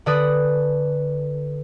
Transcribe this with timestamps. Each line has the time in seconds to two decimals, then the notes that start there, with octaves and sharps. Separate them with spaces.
0.06 D3 B4 D5 D#6